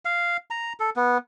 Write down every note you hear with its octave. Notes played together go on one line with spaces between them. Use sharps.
F5
A#5
A4
B3